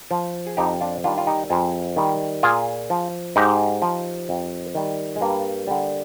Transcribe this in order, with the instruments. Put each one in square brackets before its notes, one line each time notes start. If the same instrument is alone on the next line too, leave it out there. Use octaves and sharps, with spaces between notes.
[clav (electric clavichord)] F3
G#4
F2 D#4 G4
G4
D4 F4
D#3 G3 D4 F4
F4
D#4 G4
F2 F4 G#4
D#3 G3
A#2 F4 G#4
F3
G#2 D#4 G4
F3
F2
D#3 G3
G#3
G2 G3 A#3
D3 G3